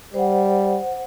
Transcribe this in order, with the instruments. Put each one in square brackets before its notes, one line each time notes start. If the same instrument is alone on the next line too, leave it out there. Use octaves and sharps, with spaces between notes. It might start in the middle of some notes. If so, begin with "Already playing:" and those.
[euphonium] G3 [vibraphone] C5 F#5